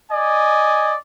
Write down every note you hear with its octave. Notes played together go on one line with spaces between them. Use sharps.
D5 D#5 G#5